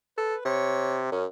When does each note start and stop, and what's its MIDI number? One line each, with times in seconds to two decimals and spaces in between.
0.18 0.35 69
0.18 0.41 71
0.45 1.10 48
0.45 1.02 73
1.12 1.26 42
1.12 1.23 61